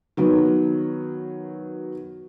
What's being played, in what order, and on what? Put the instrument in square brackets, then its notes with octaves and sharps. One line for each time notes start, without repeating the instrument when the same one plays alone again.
[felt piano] D#3 F#3 B3